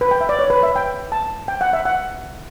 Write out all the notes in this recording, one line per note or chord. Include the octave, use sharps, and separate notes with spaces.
B4
G5
E5
D5
C#5
B4
E5
G5
A5
G5
F#5
E5
F#5